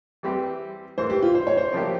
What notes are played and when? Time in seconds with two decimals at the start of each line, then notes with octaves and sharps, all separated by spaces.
0.23 E3 G3 C4 E4 G4
0.98 G#2 E3 A#3 C5
1.10 G4
1.23 F4
1.35 C5
1.47 C#5
1.57 C5
1.72 C#3 F3 A#3 E4 G4